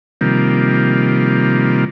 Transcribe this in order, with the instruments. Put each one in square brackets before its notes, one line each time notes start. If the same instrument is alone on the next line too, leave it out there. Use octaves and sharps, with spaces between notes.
[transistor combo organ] C3 D#3 F3 G3 A#3